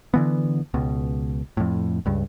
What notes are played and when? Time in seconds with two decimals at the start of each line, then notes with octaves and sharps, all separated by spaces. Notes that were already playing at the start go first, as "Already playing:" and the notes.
0.14 D3 E3 B3
0.74 C#2 B2
1.57 F2 A2
2.06 C#2 G2